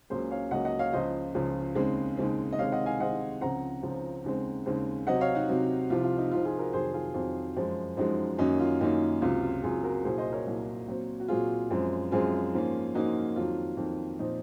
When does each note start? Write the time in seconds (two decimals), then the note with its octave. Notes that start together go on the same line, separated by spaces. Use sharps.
0.10 C#2 C#3 F#3 A#3 C#4 G#4 C5
0.31 C#5 F5
0.51 C#2 C#3 F#3 A#3 C#4 D#5 F#5
0.65 D#5 F#5
0.79 C#5 F5
0.93 C#2 C#3 F3 C5 D#5
1.35 C#2 C#3 F3
1.75 D#2 C#3 G#3 C4
2.17 D#2 C#3 G#3 C4
2.53 D#5
2.58 C3 D#3 G#3 C4 C#5 F5
2.72 D#5 F#5
2.86 F5 G#5
3.00 C3 D#3 G#3 C4 D#5 F#5
3.41 C#2 C#3 F3 C4 F#5 A#5
3.83 C#2 C#3 F3 C4
4.24 D#2 C#3 G#3 C4
4.66 D#2 C#3 G#3 C4
5.07 C3 F#3 C4 D#5 F#5
5.21 C#5 F5
5.34 D#4 F#4
5.49 C3 F#3 C4
5.90 C2 C3 F3 F4
6.04 F4
6.18 D#4
6.31 C2 C3 F3 F4
6.45 F4 G#4
6.59 F#4 A#4
6.73 F2 C3 D#3 F#3 G#4 C5
6.94 F4 G#4
7.14 F2 C3 D#3 F#3 F4
7.56 F#2 F3 G#3
7.97 F#2 F3 G#3 D#4 F#4
8.38 F#2 D#3 A#3 C#4 D#4 F#4
8.60 F4
8.81 F#2 D#3 A#3 C#4 D#4
9.22 C#2 C3 F#3 F4
9.42 F4
9.63 C#2 C3 F#3 F4 G#4
9.83 F#4 A#4
10.04 C2 A#2 F#3 G#4 C5
10.18 C5 D#5
10.32 A#4 C#5
10.46 C2 A#2 F#3
10.88 A#2 F#3 C4
11.20 F#4
11.28 A#2 F#3 C4 F4 G#4
11.71 F#2 F3 G#3 C4
12.11 F#2 F3 G#3 C4 F4 G#4
12.53 G#2 F3 A#3 C#4
12.95 G#2 F3 A#3 C#4 D#4 F#4
13.36 F2 D#3 F#3 F4
13.77 F2 D#3 F#3
14.19 A#2 F3 C4 D#4